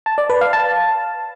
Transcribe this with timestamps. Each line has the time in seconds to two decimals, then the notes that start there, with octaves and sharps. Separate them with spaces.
0.06 A5
0.18 D5
0.30 B4
0.41 F5
0.53 A5